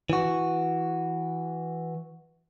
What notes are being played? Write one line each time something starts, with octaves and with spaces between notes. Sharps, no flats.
E3 F#4